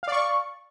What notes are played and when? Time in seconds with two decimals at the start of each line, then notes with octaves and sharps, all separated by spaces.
0.03 F5
0.08 D5
0.12 C#6